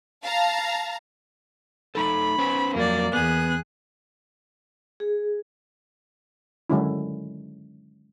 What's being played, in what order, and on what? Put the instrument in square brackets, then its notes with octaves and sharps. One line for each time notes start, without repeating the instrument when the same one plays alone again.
[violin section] F5 A5 A#5
[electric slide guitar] A3 D#4 A4 [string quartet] B5
[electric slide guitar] C#4 B4 C5
[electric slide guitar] F2 F#3 [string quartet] A#3 D5
[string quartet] E2 G#4 F#6 [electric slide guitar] B3
[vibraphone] G#4
[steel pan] D3 D#3 F#3 G#3 C#4 E4